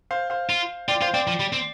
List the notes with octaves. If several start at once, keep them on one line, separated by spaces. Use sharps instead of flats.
C5 F5
C5 F5
F4
F4 D5 G5
F4 C5 F5
C4 D5 G5
F3
G3
C4